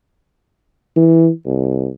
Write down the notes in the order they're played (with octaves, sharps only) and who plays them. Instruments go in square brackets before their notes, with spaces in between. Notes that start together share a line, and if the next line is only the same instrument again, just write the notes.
[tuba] E3
C2